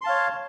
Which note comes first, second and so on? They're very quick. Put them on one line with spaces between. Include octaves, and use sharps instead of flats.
C6 A5 F5 C#5